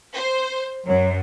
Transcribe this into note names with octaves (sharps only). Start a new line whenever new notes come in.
C5
F#2 F#3